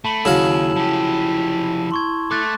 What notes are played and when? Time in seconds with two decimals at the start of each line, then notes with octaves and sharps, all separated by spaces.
0.05 A3 A5 B5 F#7
0.25 D#2 C#3 F#3 E4 F5 E6 E7 F#7
0.76 F3 G4 A5
1.92 C6 C#6 G#6
2.31 A3 A4 D6 F#6 A6